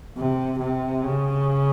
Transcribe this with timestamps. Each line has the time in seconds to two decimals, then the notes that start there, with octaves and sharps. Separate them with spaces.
0.18 C3
0.60 C3
1.03 C#3